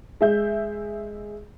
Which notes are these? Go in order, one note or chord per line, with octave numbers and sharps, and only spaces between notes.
G#3 E5 G6